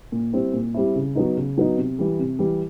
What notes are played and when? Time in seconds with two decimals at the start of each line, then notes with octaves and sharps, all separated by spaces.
0.12 A#2
0.33 G3 C4 E4
0.54 A#2
0.74 G3 C4 E4
0.95 C#3
1.15 F#3 B3 D#4
1.37 C#3
1.58 F#3 B3 D#4
1.77 C3
1.99 E3 G3
2.19 C3
2.39 E3 G3